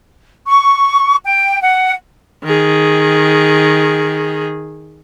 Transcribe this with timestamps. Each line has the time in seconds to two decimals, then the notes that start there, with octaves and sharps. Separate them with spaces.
0.47 C#6
1.24 G5
1.61 F#5
2.44 D#3 G#4